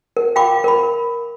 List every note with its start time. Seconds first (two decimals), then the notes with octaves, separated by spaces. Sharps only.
0.17 A#4
0.36 F5 G5 B5 D6
0.64 A#4 B5